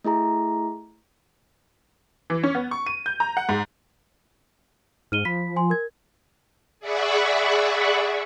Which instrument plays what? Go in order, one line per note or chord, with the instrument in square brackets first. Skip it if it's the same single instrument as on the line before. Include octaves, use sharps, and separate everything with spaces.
[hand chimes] A3 E4 G#4 A#5
[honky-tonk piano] E3
C#4
B3
C#6
D#7
G6
A#5
F#5
G#2
[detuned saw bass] G#2 [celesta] F6 D#7 G7
[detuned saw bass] F3 [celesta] B5 B6
[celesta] G#5 C6
A#4 G#6
[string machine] G#4 D5 E5 F#5 B5 C#6